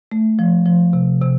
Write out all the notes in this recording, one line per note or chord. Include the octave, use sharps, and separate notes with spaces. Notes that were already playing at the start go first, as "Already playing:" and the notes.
A3
F3
F3
C3
C3